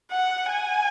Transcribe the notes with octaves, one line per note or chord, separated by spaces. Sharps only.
F#5
G#5